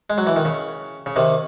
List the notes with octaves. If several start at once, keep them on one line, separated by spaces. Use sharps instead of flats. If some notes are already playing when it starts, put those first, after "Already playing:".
G#3
F#3
E3
D#3
C#3
C#3
C3 D#3